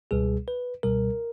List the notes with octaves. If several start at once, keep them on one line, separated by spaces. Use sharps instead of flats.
C#2 B2 G3 G#4
B4
C#2 B2 G3 A#4